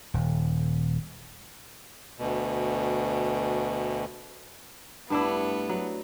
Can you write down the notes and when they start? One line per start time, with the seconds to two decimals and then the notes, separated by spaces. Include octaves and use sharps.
0.14 D#1
2.19 D2 B2
5.10 G2 A3 B3 D4 E4
5.69 F#3